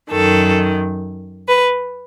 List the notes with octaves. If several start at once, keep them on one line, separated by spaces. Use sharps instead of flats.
F#2 D#3 A4
B4